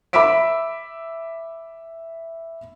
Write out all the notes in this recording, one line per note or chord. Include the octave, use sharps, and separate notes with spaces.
E5 B5 D6 E6 B6 D7